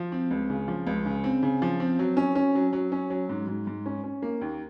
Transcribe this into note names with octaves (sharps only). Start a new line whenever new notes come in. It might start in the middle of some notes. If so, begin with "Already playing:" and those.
Already playing: F3
C4
C#2
C#3
F3
C#2
C#3
C4
C#3
F3
C4
F#3
C#4
C#4
F#3
F#3
C#4
F#3
G#2
G#2
G#2
C#4
C#4
A#3
D#2